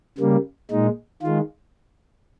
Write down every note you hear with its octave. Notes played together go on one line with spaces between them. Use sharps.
C#3 G3 A#3
A#2 G#3 D#4
D#3 G#3 F4